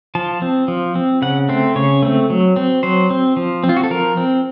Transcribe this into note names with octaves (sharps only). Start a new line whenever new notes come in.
F3 A5
C4
F3
C4
C#3 F#5
A3 C4
C#3 C#5
A3 C4
F#3
C4
F#3 C5
C4
F3
C4
F4
F#4
A4
F3 A#4
C4